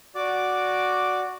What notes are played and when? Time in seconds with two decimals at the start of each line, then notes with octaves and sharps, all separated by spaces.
0.15 F#4 D5 D6